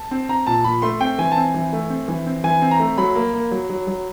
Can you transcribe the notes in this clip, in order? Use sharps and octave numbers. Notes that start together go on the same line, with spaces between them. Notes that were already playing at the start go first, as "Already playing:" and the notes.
Already playing: A5
C4
C4 A#5
A#2 A5
A#2 B5
A3 C6
C4 G5
E3 G#5
A5
C4 G#5
E3
A3
C4
E3
C4
E3 G#5
C4
A#5
A3
F#3 B5
A#3
A#3
F#3
F#3
F#3